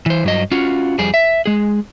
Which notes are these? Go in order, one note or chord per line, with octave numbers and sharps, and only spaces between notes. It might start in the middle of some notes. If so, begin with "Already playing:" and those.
E3 C5
G2 F#3 D#5
C#4 F4 F#4
F2 G3 G#4
E5
G#3 G#4